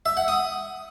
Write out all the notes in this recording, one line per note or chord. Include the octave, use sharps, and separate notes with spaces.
E5
F#5
D#6